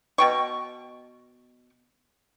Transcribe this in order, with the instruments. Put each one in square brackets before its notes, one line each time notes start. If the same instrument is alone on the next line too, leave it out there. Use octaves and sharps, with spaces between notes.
[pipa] B2 G5 C#6